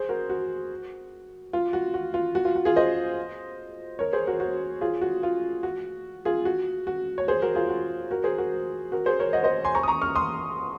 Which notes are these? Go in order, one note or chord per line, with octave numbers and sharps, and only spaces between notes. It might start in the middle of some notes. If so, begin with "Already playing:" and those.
Already playing: G#4 C5
F#4 A#4
F#4
F4
F#4
F#4
F4
F#4
F4
F#4
F4 G#4
C5 D#5
A#4 C#5
G#4 C5
F#4 A#4
F#4
F4 G#4
F#4
F4
F#4
F4 G#4
F#4
F#4
C#5
G#4 C5
F#4 A#4
F4 G#4
F#4
F#4 A#4
G#4 C5
F#4 A#4
F#4 A#4
G#4 C5
A#4 C#5
D#5 F#5
C5 D#5
G#5 C6
A#5 C#6
D#6
A#5 C#6
C#6 F6
C6 D#6